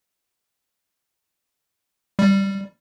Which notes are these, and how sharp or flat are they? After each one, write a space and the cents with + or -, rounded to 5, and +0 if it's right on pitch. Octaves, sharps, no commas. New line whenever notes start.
G3 +0